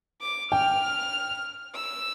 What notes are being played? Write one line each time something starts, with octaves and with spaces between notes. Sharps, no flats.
D6
G5 F6
E6